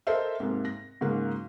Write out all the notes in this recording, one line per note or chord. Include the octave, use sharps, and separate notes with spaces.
A4 A#4 C5 D#5 E5
G#2 C3 A#3
A#6
G#2 C#3 F#3 A#3